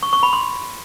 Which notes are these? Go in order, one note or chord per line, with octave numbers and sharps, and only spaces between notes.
C#6
C#6
B5
C6